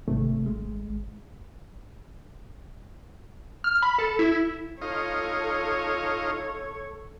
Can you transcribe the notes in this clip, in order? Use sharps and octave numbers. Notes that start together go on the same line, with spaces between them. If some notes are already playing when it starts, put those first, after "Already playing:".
G#1 C3 A3
G#3
F6
B5
A4
E4
D#4 F4 A4 C#5